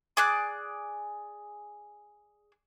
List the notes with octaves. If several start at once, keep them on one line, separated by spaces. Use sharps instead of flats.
G#4 D5 F#6